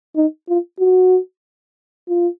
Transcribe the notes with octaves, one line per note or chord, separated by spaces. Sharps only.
D#4
F4
F#4
F4